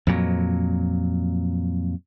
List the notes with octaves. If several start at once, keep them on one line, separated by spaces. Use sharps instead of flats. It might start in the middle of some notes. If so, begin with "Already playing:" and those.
F2 A#2 F#3